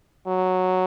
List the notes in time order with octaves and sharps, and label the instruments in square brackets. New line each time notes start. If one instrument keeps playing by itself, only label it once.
[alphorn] F#3